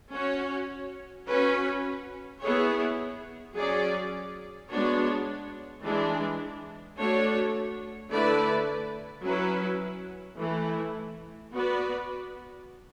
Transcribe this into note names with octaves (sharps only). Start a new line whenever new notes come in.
C#4 F#4 C#5
C#4 F#4 B4
B3 E4 G#4 C#5
F#3 C#4 G#4 D5
G#3 B3 D4 F#4 C#5
E3 G#3 D4
A3 D4 F#4 C#5
D3 A3 E4 B4 D5
F#3 C#4 E4 B4
E3 A3 E4
B3 F#4 B4 D5